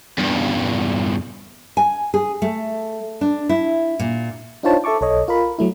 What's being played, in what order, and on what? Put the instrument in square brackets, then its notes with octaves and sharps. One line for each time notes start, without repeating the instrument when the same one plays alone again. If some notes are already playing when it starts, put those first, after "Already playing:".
[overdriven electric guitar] E2 G2
[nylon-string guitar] G#5
G#4
A3
D4
E4
A#2
[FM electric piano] D4 D#4 F4 C5 C#5 A5
A4 E5 A5 C#6 D6
B1 A4 C#5 D#5
F4 A#4 B5
F#3 A3 E4